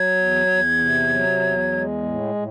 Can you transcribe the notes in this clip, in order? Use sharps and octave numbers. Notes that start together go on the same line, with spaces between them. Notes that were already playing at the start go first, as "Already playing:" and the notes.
Already playing: F#3 G#6
E2
E2
C3
F#3
E2
G#3
A2
A2